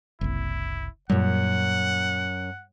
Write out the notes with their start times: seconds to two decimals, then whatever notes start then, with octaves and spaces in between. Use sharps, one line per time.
0.21 F#1 C2 E4
1.10 F#2 A#2 G3 F#5